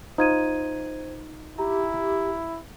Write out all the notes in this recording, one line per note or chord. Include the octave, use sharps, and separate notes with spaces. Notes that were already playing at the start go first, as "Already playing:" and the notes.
D#4 F4 C5 G#6 D#7
E4 G4 A#5